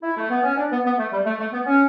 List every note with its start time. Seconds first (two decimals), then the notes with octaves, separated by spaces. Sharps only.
0.03 E4
0.17 A3
0.30 B3
0.43 C#4
0.57 D4
0.71 B3
0.85 B3
0.98 A3
1.12 G3
1.25 A3
1.39 A3
1.52 B3
1.66 C#4